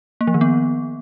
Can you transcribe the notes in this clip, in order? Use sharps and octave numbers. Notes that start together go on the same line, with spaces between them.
A#3
F3
D#3
B3